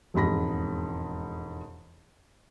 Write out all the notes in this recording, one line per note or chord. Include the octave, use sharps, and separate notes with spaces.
E1 F2 G#2 B5 A#6